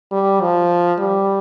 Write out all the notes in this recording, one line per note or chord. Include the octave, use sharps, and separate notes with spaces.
G3
F3
G3